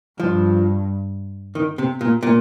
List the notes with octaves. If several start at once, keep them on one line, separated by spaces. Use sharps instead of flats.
G2 F3
D#3
C3
A#2
A#2